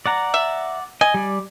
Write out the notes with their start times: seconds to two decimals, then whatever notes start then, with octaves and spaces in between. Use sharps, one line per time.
0.06 D5 F#5 A#5
0.34 E5
1.01 D#5 G#5
1.14 G3 D5